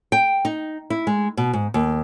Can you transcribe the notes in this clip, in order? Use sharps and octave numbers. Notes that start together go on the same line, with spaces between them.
G5
D#4
E4
G#3
B2
G#2
D#2